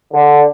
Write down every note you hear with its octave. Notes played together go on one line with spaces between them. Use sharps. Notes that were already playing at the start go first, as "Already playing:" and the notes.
D3